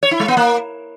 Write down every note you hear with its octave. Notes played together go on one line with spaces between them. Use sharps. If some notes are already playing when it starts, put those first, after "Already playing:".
C#5
E4
G#3
B3
A#3